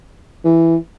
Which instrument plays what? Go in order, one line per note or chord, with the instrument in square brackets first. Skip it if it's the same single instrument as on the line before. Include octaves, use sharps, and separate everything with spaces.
[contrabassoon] E3